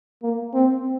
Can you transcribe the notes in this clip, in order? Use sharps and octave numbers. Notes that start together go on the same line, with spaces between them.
A#3
C4